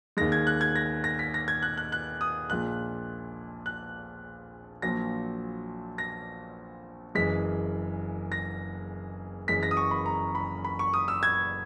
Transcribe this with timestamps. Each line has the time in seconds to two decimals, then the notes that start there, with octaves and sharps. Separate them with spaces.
0.17 D#2 D#3 G#3 A#6
0.32 G#6
0.47 F#6
0.61 G#6
0.75 A#6
1.04 A#6
1.19 B6
1.34 A#6
1.48 G#6
1.63 F#6
1.78 F#6
1.92 F#6
2.21 D#6
2.50 A#1 A#2 G#3 F#6
3.66 F#6
4.82 A#1 A#2 F#3 A#6
5.98 A#6
7.15 F#1 F#2 E3 G#3 B6
8.32 A#6
9.48 F#1 F#2 E3 G#3 B6
9.63 A#6
9.71 D#6
9.77 C#6
9.91 B5
10.06 A#5
10.35 B5
10.64 B5
10.79 C#6
10.93 D#6
11.08 E6
11.23 G#6